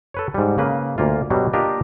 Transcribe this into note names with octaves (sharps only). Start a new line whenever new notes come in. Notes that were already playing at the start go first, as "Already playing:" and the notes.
A4 B4 C#5
G#2 G3
C#3 A#3 B4
D2 A#3 F4
G2 B2 F#3 G3
A#3 D4 F4 G4 A#4 D#5